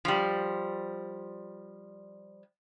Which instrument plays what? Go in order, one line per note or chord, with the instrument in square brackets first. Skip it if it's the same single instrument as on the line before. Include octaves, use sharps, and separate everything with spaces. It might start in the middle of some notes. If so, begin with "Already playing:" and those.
[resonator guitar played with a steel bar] F3 G3